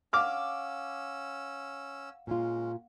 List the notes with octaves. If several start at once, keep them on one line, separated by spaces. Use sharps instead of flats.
C#4 F5 F#5 D6 E6 F6
A#2 G#3 C#4 F4